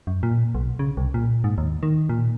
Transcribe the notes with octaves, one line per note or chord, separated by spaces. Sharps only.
F#2
A#2
B1
C#3
C2
A#2
G#2
D#2
D#3
A#2